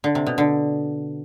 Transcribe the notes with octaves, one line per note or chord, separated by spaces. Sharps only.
D3
C3
B2
D3